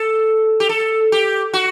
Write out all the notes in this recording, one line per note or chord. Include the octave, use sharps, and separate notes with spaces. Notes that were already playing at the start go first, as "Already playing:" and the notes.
Already playing: A4
G4
A4
G4
F#4